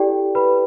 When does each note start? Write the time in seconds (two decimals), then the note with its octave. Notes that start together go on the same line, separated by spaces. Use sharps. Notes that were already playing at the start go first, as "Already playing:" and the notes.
Already playing: E4 G4 A4 D5 G5
0.35 B4 B5